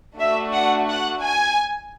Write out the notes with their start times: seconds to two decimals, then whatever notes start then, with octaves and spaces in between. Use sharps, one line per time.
0.18 A3 D4 F#4 E5
0.54 F#5
0.89 F#5
1.24 G#5